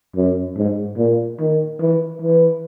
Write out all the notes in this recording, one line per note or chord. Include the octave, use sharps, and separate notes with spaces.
F#2
G#2
A#2
D#3
E3
E3